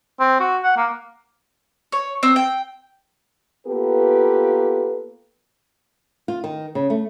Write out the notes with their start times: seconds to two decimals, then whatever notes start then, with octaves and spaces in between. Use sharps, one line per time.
0.20 C4
0.40 F#4
0.63 F#5
0.77 A#3
1.92 C#5
2.23 C4
2.36 G5
3.67 A#3 B3 F4 G4 A4 B4
6.28 F4
6.44 D#3
6.75 C#3
6.90 A3